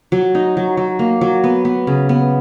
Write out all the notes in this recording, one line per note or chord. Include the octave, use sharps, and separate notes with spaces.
F#3
D#4
F#3
F#3
A#3
F#3
B3
B3
C#3
B3